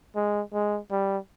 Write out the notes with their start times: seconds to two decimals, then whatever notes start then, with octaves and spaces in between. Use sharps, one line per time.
0.16 G#3
0.53 G#3
0.91 G3